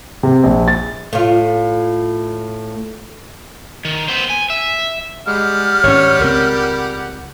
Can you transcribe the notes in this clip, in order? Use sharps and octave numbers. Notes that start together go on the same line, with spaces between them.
C3
A#1
A6
A2 F4
D#3
B3 C5
G#5
E5
G3 G#3 F#5 F6
G#1 C#4 C#5
C#2 C4 A#4